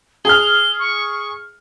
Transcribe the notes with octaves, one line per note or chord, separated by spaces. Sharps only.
G#4 F6 G7
C#6